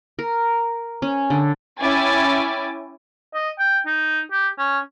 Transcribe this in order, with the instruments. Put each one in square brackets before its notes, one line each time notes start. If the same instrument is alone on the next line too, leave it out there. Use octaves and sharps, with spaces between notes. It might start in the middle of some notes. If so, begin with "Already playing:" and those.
[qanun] A#4
C#4
D3
[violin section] C#4 E4 G5 G#5 D6 A6
[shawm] D#5
G5
D#4
G4
C#4